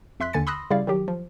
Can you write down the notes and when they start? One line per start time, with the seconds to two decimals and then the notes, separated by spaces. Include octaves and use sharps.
0.20 F2 E5 C6 F#6 B6
0.33 D#2 D3 G#5 A6 C#7
0.47 B5 C6 D#6 E6 F#6 A#6
0.70 C#3 G3 E4 D5 F5
0.87 D#3 F#3 G4
1.08 F3